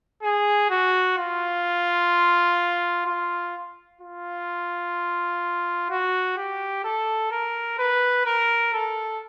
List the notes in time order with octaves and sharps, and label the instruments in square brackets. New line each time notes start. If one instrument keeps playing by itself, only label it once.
[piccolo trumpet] G#4
F#4
F4
F4
F4
F#4
G4
A4
A#4
B4
A#4
A4